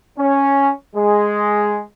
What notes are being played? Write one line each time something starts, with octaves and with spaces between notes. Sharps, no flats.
C#4
G#3